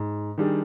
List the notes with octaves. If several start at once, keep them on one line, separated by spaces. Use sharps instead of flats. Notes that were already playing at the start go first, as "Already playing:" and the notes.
Already playing: G#2
D#3 G3 D4 G#4